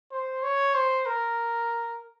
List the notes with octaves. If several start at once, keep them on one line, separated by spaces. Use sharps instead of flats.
C5
C#5
C5
A#4